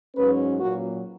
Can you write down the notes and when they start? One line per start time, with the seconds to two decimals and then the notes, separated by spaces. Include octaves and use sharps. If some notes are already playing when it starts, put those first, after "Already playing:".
0.16 G#2 F#3 C#4 B4
0.59 A#2 F#3 A#3 F#4